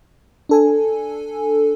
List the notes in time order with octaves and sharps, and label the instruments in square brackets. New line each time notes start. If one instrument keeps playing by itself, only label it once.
[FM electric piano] D4 A4 G#5